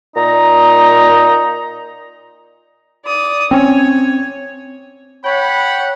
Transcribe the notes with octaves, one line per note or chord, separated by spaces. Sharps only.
A#2 D#4 A#5
D5 D#6
C4 C#4 C#5
C#5 F#5 G5 B5